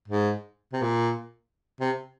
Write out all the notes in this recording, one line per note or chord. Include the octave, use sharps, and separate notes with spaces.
G#2
C3
A#2
C3